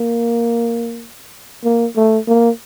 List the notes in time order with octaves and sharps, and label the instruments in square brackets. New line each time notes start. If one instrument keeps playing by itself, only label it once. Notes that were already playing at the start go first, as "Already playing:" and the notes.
Already playing: [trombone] A#3
A#3
A3
A#3